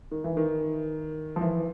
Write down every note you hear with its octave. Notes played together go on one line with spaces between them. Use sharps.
D#3
E3
D#3
F3
E3